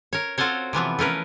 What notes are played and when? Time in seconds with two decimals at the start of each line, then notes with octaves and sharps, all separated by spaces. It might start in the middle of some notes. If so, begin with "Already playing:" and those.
0.13 A#4 C#5
0.38 C4 F4 F#4 A4 C5 C#5
0.73 C3 E3 F3 B3
0.99 A3 C#4 A#4 B4